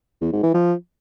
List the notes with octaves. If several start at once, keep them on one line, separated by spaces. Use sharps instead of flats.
E2
G#2
E3
F3